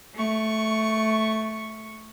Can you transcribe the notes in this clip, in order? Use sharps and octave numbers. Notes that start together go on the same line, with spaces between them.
A3 C#6